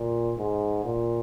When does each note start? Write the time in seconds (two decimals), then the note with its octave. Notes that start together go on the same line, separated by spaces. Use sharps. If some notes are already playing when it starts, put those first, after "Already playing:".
Already playing: A#2
0.38 G#2
0.84 A#2